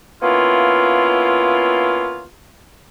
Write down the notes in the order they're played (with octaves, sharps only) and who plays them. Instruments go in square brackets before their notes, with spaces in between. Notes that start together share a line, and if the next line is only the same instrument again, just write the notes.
[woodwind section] A#3 B3 C#4 E4 F4